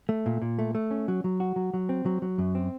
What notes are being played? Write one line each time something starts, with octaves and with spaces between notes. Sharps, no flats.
A3
A#2
A#2
A3
A3
C#4
F#3
F#3
F#4
F#3
F#3
C4
F#3
F#3
F#2
C4